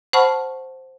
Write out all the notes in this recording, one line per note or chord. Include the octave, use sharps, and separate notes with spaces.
C5 F#5 A5 B5 C#6 F6